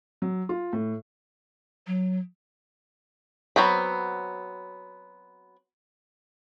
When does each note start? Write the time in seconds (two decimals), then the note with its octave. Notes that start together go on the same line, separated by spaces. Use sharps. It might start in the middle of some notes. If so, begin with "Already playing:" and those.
0.22 F#3
0.49 F4
0.73 A2
1.87 F#3
3.56 F#3 B3 C4 B5